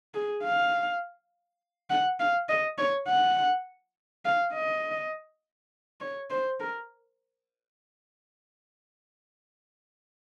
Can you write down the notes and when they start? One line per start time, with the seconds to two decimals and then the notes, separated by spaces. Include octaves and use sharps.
0.14 G#4
0.44 F5
1.90 F#5
2.20 F5
2.49 D#5
2.78 C#5
3.08 F#5
4.25 F5
4.54 D#5
6.01 C#5
6.30 C5
6.60 A#4